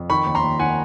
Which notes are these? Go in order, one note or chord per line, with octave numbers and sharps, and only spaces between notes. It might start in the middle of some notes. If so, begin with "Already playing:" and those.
Already playing: F2
D#3 B5 C#6
D#2
A#5 C6
D#2
D#3 F#5 G#5